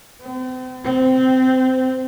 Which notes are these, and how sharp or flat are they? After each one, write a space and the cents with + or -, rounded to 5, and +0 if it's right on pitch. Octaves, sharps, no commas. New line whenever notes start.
C4 -40
C4 -15